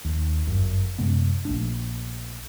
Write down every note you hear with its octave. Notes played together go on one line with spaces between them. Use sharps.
D#2
G1 F#2
F#2 C3 G#3 B3
A#1 A3 D4